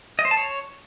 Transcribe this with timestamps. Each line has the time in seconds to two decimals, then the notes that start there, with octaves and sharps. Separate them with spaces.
0.19 D#5
0.25 C5
0.31 A5
0.37 C#5